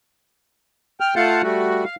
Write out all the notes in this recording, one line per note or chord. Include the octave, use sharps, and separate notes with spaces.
G5 F6
A3 F4 F5 F#5 A5 G6
G3 A3 F#4
F5